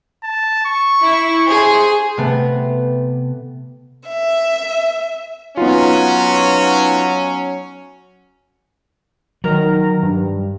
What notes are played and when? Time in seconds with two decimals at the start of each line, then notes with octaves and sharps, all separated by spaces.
0.24 A5
0.66 C#6
1.02 E4
1.48 G#4 C5
2.17 C3 A3 B3
4.09 E5
5.57 F#3 B3 C#4 D#4 F4
9.44 D#3 F#3 A#4 A#5
10.02 G2